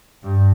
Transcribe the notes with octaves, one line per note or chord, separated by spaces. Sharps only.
G2